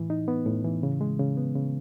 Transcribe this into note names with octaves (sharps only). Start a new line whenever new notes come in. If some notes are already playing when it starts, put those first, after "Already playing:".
Already playing: A2 E3
D#4
B3
A2
E3
C#3
G#3
C#3
B3
C#3